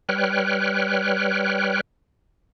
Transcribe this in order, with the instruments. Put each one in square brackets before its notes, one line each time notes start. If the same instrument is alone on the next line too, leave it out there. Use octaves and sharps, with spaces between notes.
[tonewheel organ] G3 B4 C#5 G5 F6 F#6